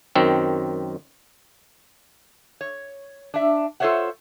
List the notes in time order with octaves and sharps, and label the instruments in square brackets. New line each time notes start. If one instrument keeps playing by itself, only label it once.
[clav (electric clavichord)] F#2 D#3 C4
[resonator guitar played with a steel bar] C#5
D4 E5
F4 A4 C5 C#5 E5 F#5